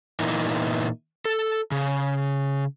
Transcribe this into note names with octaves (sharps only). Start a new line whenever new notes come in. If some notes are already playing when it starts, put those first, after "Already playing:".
A#2 E3 A#3 B3 D#4 E4
A4
C#3